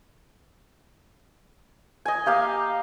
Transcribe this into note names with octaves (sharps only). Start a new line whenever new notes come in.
D#5 G#5
A#3 G4 F5